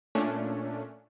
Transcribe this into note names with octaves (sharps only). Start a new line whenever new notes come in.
A#2 A3 C#4 D4